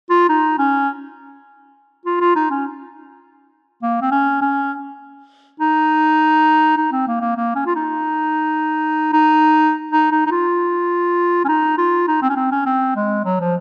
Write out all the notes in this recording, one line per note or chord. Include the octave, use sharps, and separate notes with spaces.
F4
D#4
C#4
F4
F4
D#4
C#4
A#3
C4
C#4
C#4
D#4
D#4
C4
A#3
A#3
A#3
C#4
F4
D#4
D#4
D#4
D#4
D#4
F4
C#4
D#4
F4
D#4
C4
C#4
C4
C#4
C4
G#3
F#3
F3